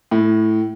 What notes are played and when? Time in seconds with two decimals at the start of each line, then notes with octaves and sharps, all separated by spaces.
0.11 A2